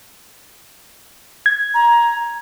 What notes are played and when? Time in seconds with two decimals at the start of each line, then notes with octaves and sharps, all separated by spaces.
1.46 G#6
1.74 A#5